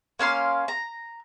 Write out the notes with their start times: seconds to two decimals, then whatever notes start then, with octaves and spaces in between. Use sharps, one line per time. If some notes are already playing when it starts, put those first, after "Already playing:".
0.19 A#3 C#4 F5 C6
0.68 A#5